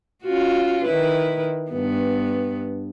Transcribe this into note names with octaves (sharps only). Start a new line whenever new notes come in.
C#4 F4 F#4
D#3 E4 B4
G2 B3